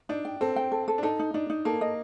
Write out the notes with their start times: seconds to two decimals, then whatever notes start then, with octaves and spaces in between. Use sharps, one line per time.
0.09 D4 D#4
0.25 G5
0.41 C4 A4
0.56 G5
0.72 A4
0.88 A4
0.98 D4
1.03 D#4 A4
1.19 D#4
1.34 D4 D#4
1.50 D#4
1.65 A#3 A4
1.81 D#5